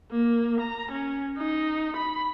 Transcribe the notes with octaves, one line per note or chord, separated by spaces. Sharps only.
A#3
A#5
C#4
D#4
B5